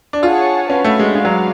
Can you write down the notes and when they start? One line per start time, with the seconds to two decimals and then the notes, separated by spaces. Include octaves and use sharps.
0.13 D4
0.22 F4 G#4 C#5 F#5 A5
0.68 C#4 F#4 B4 F5
0.84 A3
0.99 G#3
1.15 G#3 F#4 B4 D5 F5
1.25 F#3